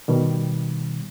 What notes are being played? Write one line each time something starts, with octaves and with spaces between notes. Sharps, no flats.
B2 D#3 G3